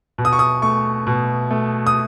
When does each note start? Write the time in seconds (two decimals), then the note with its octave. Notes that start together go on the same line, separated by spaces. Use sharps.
0.18 B2
0.25 D#6
0.33 C#6
0.39 D#6
0.62 A3 C#6
1.07 B2
1.51 A3
1.87 D#6